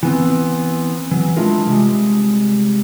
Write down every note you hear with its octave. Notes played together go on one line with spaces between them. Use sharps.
E3 B3 C4
E3 F#3
G#3 D4 E4 F4 A#4
C3 G3 G#3